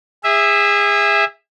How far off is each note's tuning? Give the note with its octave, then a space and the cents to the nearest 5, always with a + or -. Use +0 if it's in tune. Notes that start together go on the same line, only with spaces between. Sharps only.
G#4 -25 E5 +0